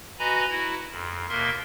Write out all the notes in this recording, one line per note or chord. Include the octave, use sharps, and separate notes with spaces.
F#4 B4 D#5 G#5 A#5 B5
E4 F#4
F2
D#2 B2 A#3 A#4 E5 C6